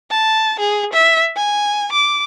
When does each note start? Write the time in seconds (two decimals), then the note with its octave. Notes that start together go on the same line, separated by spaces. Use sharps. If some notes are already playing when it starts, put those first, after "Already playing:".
0.10 A5
0.60 G#4
0.93 E5
1.36 G#5
1.93 D6